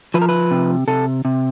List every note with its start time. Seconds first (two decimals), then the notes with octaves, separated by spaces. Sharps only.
0.14 F3 B4
0.22 A#4
0.29 B4
0.51 C3
0.88 C3 A4
1.25 C3